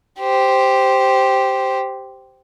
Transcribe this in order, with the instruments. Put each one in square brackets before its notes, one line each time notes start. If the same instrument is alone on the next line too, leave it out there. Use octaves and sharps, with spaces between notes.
[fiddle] G4 C5